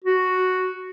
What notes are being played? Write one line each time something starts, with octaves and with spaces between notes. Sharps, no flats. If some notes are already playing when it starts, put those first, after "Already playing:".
F#4